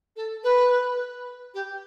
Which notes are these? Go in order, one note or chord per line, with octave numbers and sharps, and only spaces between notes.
A4
B4
G4